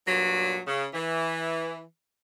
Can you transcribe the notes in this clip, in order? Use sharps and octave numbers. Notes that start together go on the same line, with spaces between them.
G2 A#2 F#3
C#3
E3